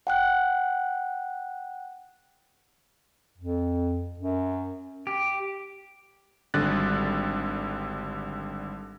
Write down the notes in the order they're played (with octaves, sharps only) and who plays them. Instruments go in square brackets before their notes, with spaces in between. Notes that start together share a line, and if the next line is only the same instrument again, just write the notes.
[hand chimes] F#5 G5 F#6
[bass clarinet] F2
F#2
[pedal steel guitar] G4
[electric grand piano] G#1 D3 G3 F#6 A6